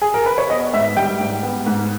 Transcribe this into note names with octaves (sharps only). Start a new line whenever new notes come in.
G#4
A#4
B4
C#5
B3 D#5
G#2 E5
G3 G5
G#2
B3
G#2